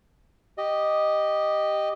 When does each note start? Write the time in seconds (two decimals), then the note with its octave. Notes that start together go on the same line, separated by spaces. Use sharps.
0.58 G4 D#5